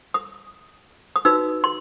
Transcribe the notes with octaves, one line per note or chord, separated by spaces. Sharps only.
D#6
D#6
D#4 F#4 B4 E6
C6